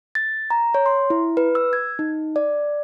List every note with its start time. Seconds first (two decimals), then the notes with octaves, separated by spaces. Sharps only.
0.15 A6
0.50 A#5
0.74 C#5
0.86 C6
1.10 E4
1.37 B4
1.55 E6
1.73 G#6
1.99 D#4
2.36 D5